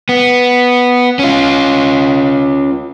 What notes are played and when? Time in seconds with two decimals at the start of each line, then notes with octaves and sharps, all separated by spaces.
0.09 B3
1.19 C#4 F4